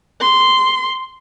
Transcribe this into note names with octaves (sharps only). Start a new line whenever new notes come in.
C6